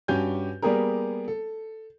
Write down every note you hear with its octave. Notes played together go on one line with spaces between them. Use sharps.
G2 C#4 F#4 G4 G#5 G6
G3 A#3 B3 G4 G#4 A#4
A4